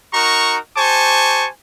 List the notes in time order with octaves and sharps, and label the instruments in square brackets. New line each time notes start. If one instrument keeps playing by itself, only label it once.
[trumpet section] D#4 F#4 A#4 A#5 C#6
G4 C5 G#5 A5 C#6